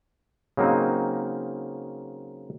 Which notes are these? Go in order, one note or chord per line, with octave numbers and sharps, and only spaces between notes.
C#3 F#3 A#3 C4 D#4